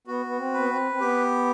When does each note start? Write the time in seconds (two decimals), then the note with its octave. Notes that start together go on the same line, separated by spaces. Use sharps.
0.07 B3 F#4
0.26 B3
0.38 C4
0.53 B3 B4
0.69 C4
0.92 C4
1.00 B3 G4